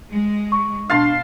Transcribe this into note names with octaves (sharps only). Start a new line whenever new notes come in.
G#3
C#6
B2 D4 F5 A5 C6